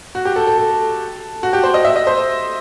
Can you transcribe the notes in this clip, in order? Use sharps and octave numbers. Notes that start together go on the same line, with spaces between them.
F#4
G4
A4
A4
A4
F#4
G4
C5
D#5
E5
D#5
C5